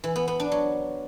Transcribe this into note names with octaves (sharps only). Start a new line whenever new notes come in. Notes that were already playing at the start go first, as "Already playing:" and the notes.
E3
B3
B3
D4
F#3